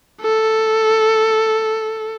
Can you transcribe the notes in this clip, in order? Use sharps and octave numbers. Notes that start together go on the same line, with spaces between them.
A4